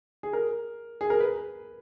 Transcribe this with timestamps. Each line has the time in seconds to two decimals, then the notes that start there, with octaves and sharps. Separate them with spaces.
0.23 G#4
0.33 A#4
1.01 G#4
1.10 A#4
1.20 B4